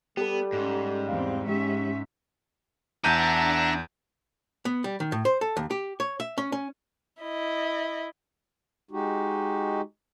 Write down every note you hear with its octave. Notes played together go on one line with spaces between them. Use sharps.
G3 B3 G4 A4
G#2 C#4
E2 C4 F5
G#3 C#4 G4 E5
E2 D4 E5 F#5 A5 A#5 G6 D#7
B3
G3
D#3
A2
C5
A4
D#2
G4
C#5
E5
C#4
C#4
E4 D#5
G#3 D#4 F#4 G4